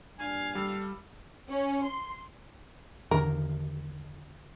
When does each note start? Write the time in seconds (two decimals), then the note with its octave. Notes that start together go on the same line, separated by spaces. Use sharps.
0.19 G2 A#2 D4 F5 G#5
0.55 G3 A4
1.50 C#4
1.85 C6
3.11 E2 D3 D#3 A#4